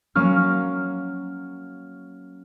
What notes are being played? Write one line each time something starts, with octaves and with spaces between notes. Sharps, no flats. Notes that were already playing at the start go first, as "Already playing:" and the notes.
F#3 A#3 C#4 F6